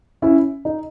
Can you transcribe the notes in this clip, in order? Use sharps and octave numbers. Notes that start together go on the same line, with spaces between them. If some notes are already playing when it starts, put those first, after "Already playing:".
C#4 E4
D#4